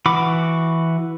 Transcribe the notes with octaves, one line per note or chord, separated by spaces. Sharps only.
E3 F#4 B5 D6